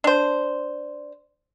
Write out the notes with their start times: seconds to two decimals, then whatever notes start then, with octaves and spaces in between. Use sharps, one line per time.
0.04 D4 C5